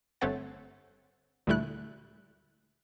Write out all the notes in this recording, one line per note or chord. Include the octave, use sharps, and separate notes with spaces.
G1 A3 C4 C#5 F#5 A6
D2 A#2 G3 A3 E4 F#6